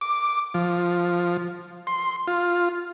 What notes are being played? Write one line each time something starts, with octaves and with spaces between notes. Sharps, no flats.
D6
F3
C6
F4